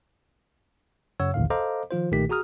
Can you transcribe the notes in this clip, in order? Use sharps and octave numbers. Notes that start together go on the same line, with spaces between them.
F#2 C#3 C#5 F#5 E6
A#1 D#2 A2 D3 D#3 F5
A4 C5 D#5 F5 A#5 D6
D#3 F3 F4 C5
B1 A#2 D#3 A3 G4 B6
F#4 G#4 A#5 D#6 F6